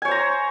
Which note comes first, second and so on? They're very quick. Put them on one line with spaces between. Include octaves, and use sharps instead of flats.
G#5 C#5 C5 A#5